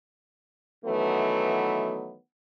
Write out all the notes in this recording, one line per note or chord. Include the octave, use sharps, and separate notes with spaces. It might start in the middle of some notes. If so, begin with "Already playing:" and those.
D#3 E3 F#3 A3 B3